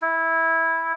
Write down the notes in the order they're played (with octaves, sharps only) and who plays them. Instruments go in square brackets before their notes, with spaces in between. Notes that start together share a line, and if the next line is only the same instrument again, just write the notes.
[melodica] E4